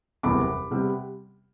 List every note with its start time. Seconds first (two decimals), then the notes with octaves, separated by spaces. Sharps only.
0.23 F#1 E2 C3 G3 B3 B5 D6
0.71 C3 G3 B3